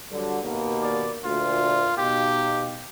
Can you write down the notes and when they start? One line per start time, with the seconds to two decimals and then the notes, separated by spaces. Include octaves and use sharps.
0.11 G2 D3 F#3
0.42 D#2 B2 A#3
0.82 D5
1.24 D2 A#2 F4
1.97 B2 D#4 G4 F5